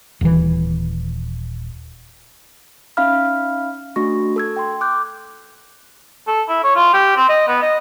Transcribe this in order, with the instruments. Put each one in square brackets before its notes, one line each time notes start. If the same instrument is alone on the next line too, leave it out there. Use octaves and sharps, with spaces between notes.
[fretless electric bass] D#1 E3
[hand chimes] C#4 D#4 E5 F5 B5 F6
A3 D4 F#4 C#6 A#6
A4 E6 G#6
G5 C6
D6 F#6 G6
[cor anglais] A4
E4
C#5
F4
G4
C4
D#5
B3
D#5